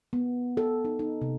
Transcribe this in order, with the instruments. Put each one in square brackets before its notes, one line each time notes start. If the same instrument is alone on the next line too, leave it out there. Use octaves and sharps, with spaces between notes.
[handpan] B3
A4
D#4
D#4
C3